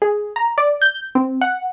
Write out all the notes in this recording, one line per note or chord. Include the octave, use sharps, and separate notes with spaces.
G#4
A#5
D5
G6
C4
F#5